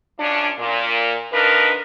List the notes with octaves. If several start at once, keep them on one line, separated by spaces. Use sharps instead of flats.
F#2 F3 C#4 D4
A#2
D3 F3 D4 D#4 A#4 B4